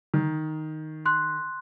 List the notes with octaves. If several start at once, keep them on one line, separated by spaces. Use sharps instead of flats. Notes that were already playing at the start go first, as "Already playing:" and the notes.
D#3
C6 F#6